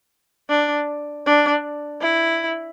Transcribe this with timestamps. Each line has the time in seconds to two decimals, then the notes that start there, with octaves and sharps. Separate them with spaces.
0.49 D4
1.26 D4
2.01 E4